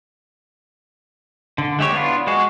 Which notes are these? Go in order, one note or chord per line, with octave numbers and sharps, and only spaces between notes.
D3
G#3 A3 G4 C#5
B3 D4 E4 F4
G#3 F#4 G#4